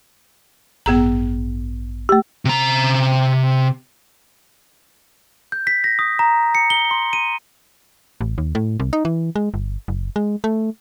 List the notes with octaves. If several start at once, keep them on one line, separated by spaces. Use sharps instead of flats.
A1 G2 B3 G#4 A#5
A3 G4
C3 A#5
G6
B6
A#6
D#6
A#5
C#7
G7
C6
D#7
A1
D#2
A2
C2
D#4
E3
G#3
G1
F#1
G#3
A3